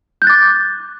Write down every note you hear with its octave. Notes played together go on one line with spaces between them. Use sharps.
D6 F#6 G6 A6